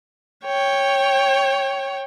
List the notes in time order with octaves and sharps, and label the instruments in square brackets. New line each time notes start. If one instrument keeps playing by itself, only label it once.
[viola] C#5 G5